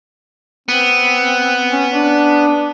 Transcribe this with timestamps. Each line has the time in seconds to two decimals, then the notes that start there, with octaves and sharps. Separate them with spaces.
0.69 B3 C4
1.72 C#4
1.93 D4